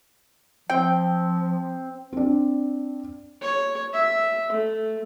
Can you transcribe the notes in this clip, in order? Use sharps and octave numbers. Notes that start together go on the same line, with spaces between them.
F3 C4 G5
C4 D4
C#5
E5
A3